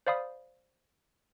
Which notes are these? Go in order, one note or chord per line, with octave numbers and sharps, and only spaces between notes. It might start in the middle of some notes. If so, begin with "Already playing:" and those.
C5 D5 F5 B5 D#6